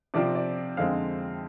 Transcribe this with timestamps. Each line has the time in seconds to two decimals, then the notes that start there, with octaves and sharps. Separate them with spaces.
0.14 C3 F3 C4 F4 D5
0.35 D5
0.77 F2 D3 G#3 C4 F5